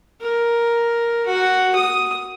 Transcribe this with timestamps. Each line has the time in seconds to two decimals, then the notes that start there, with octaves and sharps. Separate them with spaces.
0.21 A#4
1.26 F#4
1.75 D#6